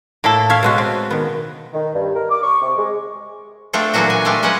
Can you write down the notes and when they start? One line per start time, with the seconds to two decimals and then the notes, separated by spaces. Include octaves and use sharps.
0.24 A2 A#3 E4 A4
0.50 C#5 E5 F5
0.63 B2 G#3 F#4
0.78 C4
1.11 D#3 B3
1.73 D#3
1.94 G2
2.14 A#4
2.30 D6
2.43 C#6
2.61 C3
2.76 G#3
3.73 A3 C4 D4 F4 A4
3.94 A#2 D3 E3 F#3 D4 F#4
4.10 G#5
4.25 G#3 A3 D4 F4 G4
4.43 F#3 G#3 C#4 B4 F#5